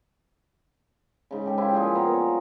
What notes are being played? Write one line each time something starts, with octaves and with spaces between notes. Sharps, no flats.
G#2 C#3
G4 A4
E4 F4 G4 C5
A#2 F3 G3 G#4
A#3 B3 A#4 F5
C#5